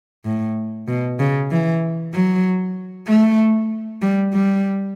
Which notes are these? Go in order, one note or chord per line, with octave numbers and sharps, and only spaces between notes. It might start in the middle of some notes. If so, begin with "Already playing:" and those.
A2
B2
C#3
E3
F#3
A3
G3
G3